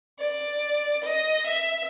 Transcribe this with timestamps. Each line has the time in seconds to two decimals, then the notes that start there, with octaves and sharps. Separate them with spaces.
0.19 D5
1.04 D#5
1.47 E5